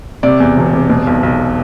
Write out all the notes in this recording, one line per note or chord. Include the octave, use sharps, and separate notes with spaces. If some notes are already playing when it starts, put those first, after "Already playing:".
C3 D5
E2
E1
C3
B2
B1
B1